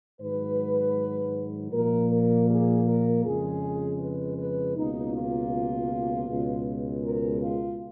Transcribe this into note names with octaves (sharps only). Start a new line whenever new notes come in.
G#2 D#3 F#3 B4
A#2 F3 A#3 A#4
A#4
G#4
A#4
F2 C#3 G#3 G#4
B4
B4
C#2 B2 A#3 D#4
F4
C#2 B2 G#3
A#4
F4